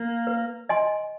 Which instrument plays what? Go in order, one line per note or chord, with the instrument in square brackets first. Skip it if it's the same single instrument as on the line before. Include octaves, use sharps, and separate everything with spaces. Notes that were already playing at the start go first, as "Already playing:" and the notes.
Already playing: [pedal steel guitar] A#3
[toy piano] B4
D#5 G#5 C6